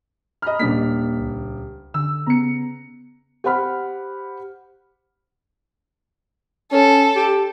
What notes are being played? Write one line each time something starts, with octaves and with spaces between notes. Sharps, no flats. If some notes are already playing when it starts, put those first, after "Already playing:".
D#5 A#5 B5 F6
D#1 A#3 D4 B6
C#2
D3 E6
C#3 B3 A#5 C#7
G4 C5 F#5 B5 F6
C#4 A4
G4